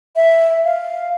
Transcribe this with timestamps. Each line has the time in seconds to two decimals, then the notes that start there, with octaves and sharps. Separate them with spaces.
0.16 E5
0.65 F5